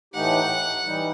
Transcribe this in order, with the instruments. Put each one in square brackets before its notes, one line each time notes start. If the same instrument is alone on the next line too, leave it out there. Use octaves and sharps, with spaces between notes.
[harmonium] A2 E3 A3 D#4 G4 [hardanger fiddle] F#5
[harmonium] E3 G3 D#4